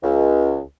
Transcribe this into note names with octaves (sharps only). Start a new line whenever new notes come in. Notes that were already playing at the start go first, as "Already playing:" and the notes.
C#2